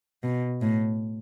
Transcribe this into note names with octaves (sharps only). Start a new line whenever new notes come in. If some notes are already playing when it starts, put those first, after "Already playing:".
B2
A2